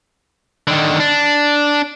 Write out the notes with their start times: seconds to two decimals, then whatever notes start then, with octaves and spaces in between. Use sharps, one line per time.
0.67 D3 D#3
1.00 D4